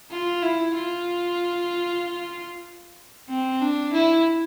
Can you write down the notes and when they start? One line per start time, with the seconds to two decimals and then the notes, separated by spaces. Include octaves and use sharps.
0.11 F4
0.42 E4
0.75 F4
3.29 C4
3.61 D4
3.93 E4